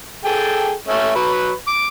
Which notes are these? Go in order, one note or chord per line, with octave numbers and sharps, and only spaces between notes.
G#4 A4 G5
A3 C#4 E5
F#3 B4
D6